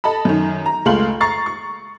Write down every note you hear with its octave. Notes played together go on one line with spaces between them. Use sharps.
A4 D#5 A5 B5
F#2 D#3
A#5
C#2 G#3 A3 F5 C6 F#7
A#5 C#6 A6 C7
C#6